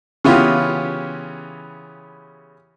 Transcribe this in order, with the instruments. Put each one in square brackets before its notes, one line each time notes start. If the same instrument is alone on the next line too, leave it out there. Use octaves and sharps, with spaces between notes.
[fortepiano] C#3 E3 B3 C#4 F4 G4